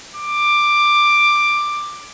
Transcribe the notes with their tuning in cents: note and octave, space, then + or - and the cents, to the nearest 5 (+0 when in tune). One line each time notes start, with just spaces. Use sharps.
D6 +10